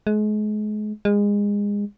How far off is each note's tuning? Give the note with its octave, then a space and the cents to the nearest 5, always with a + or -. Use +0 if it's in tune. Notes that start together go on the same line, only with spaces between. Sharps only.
G#3 +35
G#3 -25